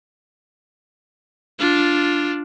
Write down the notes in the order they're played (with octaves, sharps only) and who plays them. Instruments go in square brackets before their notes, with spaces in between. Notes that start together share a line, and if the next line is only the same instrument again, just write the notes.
[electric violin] D4 F4